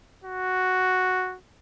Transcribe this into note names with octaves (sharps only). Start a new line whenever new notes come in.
F#4